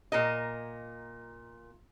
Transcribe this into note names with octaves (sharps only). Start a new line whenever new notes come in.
A#2 A#4 D#5